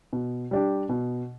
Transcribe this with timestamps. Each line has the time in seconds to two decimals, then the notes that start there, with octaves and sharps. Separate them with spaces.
0.13 B2
0.51 G3 D4 G4
0.89 B2